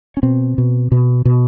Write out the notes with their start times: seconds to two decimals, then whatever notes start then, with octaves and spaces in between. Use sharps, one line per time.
0.17 C#4
0.23 B2 C4
0.58 B2
0.92 B2
1.25 B2